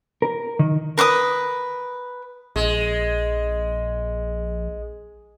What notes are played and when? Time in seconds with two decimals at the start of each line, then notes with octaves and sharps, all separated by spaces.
0.22 A#4
0.59 D#3
0.98 A#4 B4 D6 D#6
2.56 A#1 G#3